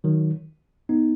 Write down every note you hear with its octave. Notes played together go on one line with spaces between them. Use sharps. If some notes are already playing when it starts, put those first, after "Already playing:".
D#3 F#3
B3 D#4